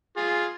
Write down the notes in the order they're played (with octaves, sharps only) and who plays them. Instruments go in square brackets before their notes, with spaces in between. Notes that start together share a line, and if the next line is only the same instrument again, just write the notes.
[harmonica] F4 G#4